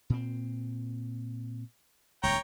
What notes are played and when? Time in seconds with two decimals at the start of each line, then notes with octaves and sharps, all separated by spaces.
0.10 A#2 C4
2.23 D#1 C#2 C#5 G5 A#5